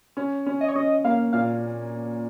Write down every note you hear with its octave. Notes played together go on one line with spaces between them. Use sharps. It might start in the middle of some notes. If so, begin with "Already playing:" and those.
C#4
C#4
D#5
C#5
C#4 D#5
A#3 F5
A#2 F5